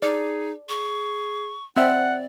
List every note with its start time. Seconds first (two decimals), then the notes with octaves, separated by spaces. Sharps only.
0.02 D#4 G#4 D5
0.69 G#4 C#6
1.76 C4 D5 E5 F#5 G5